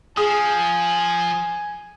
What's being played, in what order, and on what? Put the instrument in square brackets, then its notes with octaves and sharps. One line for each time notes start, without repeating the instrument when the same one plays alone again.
[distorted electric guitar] F3 [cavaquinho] G#4 [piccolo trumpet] G#5 [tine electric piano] D#6